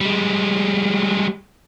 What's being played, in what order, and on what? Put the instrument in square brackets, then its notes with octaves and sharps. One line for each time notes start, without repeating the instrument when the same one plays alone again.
[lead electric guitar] G3 G#3